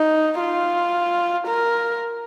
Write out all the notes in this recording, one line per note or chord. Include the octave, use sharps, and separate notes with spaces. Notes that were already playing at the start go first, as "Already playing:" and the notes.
Already playing: D#4
F4
A#4